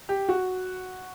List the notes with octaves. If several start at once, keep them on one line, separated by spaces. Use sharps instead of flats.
G4
F#4